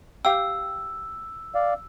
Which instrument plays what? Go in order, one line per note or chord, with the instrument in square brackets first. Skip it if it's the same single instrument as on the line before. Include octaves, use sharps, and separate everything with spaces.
[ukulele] G4 F5 G5 [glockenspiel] E6
[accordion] D5 F5